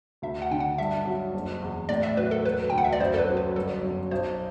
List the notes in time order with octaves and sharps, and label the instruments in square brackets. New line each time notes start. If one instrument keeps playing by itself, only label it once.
[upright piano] D2 [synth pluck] E5
[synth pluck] F#5
[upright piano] D3 [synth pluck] G5
[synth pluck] F#5
[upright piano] G2 [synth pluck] E5
[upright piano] F#3
F#1
E2
[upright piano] A2 [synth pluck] D5
[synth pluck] E5
[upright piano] F#3 [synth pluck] B4
[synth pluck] A4
[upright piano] E1 [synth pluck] B4
[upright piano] D2 [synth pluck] G5
[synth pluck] F#5
E5
D5
[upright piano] F#2 [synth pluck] C5
[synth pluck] A4
B4
[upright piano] F#3
[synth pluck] B4
[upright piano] G1 [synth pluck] A4
[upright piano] F#2
[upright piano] B1 [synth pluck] C5